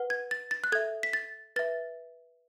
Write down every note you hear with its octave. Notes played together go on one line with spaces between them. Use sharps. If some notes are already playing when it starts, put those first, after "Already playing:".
Already playing: B4 F#5
G#6
A6
A6
F#6
A4 E5 G#6
B6
A6
B4 E5 A6